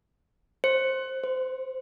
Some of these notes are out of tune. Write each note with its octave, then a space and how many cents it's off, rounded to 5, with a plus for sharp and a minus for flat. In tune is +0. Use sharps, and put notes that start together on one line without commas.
C5 +15
C5 -25